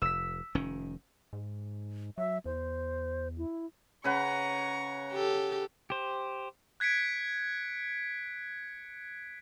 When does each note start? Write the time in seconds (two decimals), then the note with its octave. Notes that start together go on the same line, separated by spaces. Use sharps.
0.02 F1 E6 B6
0.55 F1 D#3 C#4
1.33 G#2
2.18 F#3 E5
2.46 E2 C5
3.38 E4
4.04 C#3 B4 F#5 A#5 C#6
5.13 G4 A4
5.90 G4 C5
6.80 F#6 G#6 B6 C#7 D7